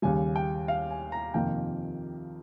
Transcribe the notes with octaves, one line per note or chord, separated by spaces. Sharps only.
D#2 C#3 G3 G#5
G5
F5
G#5
A#5
F2 C3 D#3 A#3 G5